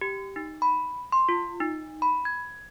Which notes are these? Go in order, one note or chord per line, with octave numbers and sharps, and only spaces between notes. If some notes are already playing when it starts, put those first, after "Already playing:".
G4
D#4
B5
C6
F4
D#4
B5
G#6